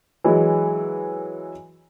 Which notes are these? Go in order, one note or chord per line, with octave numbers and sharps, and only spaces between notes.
E3 F#3 G#3